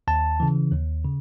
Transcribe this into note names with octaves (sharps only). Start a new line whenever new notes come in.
D#2 A5
C#3 E3
D#2
C#3